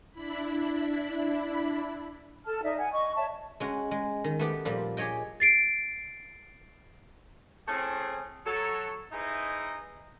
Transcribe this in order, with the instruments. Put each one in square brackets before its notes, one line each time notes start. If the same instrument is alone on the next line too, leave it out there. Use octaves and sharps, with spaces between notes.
[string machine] D4 E4 B5
[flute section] A4 A5 F6
D#4 D5 E5
F#5 G#5
D#5 C#6
C#5 D5 E5 A5
[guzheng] G#3 C#4 F#4
G#3
D#3
A3 B3 G4
A#2 F3 G3
G4 G#4 C#5 D#5 G5
[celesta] A6 C7 D7
[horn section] A3 C4 C#4 E4 G#4
F#3 A4 C#5
D#4 E4 G#4 B4 C5 D#5